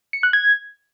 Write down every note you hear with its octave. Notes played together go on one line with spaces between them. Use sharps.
C#7
F#6
G#6